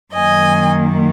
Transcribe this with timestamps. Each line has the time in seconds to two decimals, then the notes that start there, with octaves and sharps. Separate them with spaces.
0.13 F#2 D#3 A#3 D#5 G#5